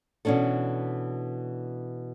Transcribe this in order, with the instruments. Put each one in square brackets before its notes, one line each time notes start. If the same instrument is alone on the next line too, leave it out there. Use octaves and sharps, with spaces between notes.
[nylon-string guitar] B2 E3 C#4 D4 A4